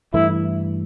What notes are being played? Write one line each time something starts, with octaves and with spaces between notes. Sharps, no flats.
G2 E3 A3 E4